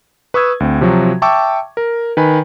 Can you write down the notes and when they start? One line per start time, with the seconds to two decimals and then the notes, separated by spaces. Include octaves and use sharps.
0.34 B4 C#6 D#6 E6 G#6
0.60 D2 C4
0.81 C3 F3 F#3 F#4
1.22 E5 G5 A5 C#6 D6 E6
1.77 A#4
2.17 D#3 B4 G#5 B5